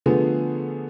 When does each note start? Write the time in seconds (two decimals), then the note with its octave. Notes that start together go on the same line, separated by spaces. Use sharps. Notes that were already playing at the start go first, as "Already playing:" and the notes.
0.06 D3 F3 A3 B3 G#4